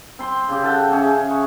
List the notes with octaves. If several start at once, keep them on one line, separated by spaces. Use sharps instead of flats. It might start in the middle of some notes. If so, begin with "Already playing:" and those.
C4 C6
C#3 G4
A4 F#5 G5 A5
C#4 G#4 E5
C#6